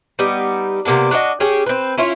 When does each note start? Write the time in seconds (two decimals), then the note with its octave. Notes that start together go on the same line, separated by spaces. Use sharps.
0.19 G3 B3 D#4
0.85 C3 A#3 B3 D4
1.11 D4 F#4 A4 D#5
1.40 C#4 G4 G#4
1.66 C4 B4
1.98 C#4 E4 F4 C#5